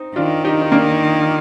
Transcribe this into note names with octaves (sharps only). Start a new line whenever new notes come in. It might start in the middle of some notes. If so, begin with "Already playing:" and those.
Already playing: C4 D#4
D#3 D4 F4
D#4 G4
D#4
A#3 D4